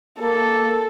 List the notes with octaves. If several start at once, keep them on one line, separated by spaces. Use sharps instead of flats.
A#3 A4